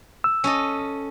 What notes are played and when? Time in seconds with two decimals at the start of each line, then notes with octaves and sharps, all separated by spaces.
0.24 E6
0.44 C#4 A4 D#5